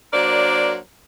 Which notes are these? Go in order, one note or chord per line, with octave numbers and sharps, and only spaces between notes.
F#3 A#3 D4 A#4 C5 D5